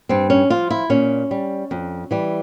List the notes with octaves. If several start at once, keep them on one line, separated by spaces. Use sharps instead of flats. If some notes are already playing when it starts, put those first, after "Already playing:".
G2 C4
C#4
F3 F4
E4
A#2 C#4
G3
F2
E3 G3